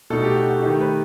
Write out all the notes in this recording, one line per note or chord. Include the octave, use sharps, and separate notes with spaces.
B2 A3 D#4 A4
G4
F#4
F#4
D#3 A3 D#4 G4
B4